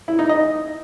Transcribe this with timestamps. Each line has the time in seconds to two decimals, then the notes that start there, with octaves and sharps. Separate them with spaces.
0.08 E4
0.19 D#4
0.29 D#5